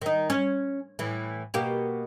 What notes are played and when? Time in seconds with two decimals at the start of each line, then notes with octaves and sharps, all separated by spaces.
0.02 D#3 D#4
0.30 C#4
0.99 A2 E3
1.54 B2 A#3 G4